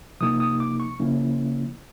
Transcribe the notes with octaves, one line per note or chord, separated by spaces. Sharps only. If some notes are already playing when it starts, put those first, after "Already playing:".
C3 F3 A#3 D#4 D#6
D#6
D6
C#6
C#3 F3 A#3 C#4 E4